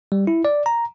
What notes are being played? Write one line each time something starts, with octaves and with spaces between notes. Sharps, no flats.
G3
E4
D5
A#5